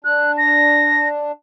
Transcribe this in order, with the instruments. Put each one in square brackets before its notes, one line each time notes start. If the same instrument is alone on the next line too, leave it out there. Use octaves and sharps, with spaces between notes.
[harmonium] D4 [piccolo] F#6
[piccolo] A#6